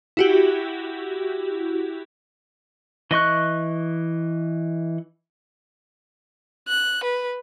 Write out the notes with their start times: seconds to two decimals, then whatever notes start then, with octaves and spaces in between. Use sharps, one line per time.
0.17 E4 F#4 G4
3.11 E3 D#5 C#6 F#6
6.68 F#6
7.03 B4